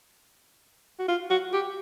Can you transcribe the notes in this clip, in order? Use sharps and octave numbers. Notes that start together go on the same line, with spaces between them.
F#4
F4
F#4
G4